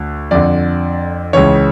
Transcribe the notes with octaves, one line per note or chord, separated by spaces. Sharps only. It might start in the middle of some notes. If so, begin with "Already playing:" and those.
Already playing: D2
F2 D3 D5
C#2 C#3 E3 C#5